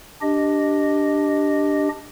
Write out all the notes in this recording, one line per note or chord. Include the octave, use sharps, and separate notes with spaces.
D4 G4 D#5